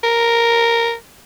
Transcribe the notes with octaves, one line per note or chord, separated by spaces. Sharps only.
A#4